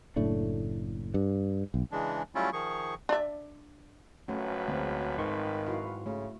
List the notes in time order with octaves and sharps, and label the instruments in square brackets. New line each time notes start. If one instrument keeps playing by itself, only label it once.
[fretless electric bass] F#1 A2 A3 D4
G2
B1
[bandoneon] C#3 E3 G#3 D4
F#3 G3 A3 C#4 E4 F4
D#3 F3 G#4 C#6
[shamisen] D4 D5 E5
[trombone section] G#1 F3 B4 [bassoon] F#3 [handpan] A3 C#4
[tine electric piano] D2 [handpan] G#3 C4
[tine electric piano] G#2 C6 C#6 [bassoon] D#3
[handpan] E4 F#4 F5
[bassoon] C#3 [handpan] A3